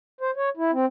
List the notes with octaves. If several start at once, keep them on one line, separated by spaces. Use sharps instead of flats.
C5
C#5
E4
C4